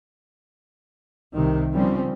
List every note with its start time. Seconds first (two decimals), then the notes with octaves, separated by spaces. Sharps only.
1.35 C2 C3 D#3
1.72 C#3 F3 G3 C4 C#4